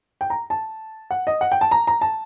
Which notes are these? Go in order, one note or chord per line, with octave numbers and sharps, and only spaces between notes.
G5
A#5
A5
F#5
D#5
F#5
G5
A5
A#5
A#5
A5